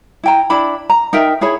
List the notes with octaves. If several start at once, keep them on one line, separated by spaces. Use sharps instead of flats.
E4 G5 A#5
D4 E4 B5
A#5
D#4 A#4 E5 G5
E4 G#4 C#5 B5